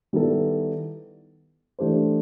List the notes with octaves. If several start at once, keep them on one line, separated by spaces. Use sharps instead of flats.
D#3 G3 B3 E4 A4
E3 A3 D4 G4 C5